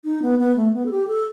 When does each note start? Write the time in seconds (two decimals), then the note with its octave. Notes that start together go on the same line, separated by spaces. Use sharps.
0.04 D#4
0.22 B3
0.39 B3
0.56 A3
0.73 B3
0.86 A4
0.91 G4
1.07 A4